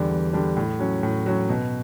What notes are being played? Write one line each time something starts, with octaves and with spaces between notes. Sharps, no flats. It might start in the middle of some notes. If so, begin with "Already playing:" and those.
Already playing: E2 D3 G3 D4
E2
D3 G3 D4
A2
F#3 C#4
A2
F#3 C#4
B2